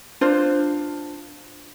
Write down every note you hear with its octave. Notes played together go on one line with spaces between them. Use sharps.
D4 F4 C5